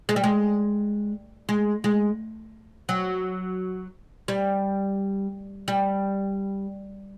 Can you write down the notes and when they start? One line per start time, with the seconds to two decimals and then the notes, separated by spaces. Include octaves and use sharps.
0.09 G#3
0.16 G3
0.24 G#3
1.49 G#3
1.84 G#3
2.89 F#3
4.28 G3
5.68 G3